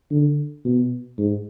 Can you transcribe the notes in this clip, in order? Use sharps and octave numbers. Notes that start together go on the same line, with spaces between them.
D3
B2
G#2